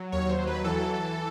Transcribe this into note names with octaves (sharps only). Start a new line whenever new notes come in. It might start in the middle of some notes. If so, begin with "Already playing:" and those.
Already playing: F#3
D#2 C#5
C5
F#3
B4
E3 A4
E3